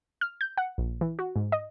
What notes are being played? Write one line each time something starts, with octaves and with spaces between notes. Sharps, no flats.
F6
G6
F#5
A#1
E3
F#4
G#2
D#5